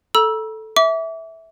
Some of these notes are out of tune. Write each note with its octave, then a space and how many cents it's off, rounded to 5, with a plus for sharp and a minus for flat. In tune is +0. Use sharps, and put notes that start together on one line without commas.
A4 -5 A#5 +45 E6 +0
E5 -15 D6 -35